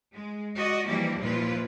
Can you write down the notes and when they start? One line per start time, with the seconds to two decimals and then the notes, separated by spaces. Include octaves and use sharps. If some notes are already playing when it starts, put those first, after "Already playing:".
0.14 G#3
0.57 F#4 D5 D#5
0.87 E3 F3 G3 A#3 D4 E4
1.18 D#2 A#2 F3 E4 F4 B4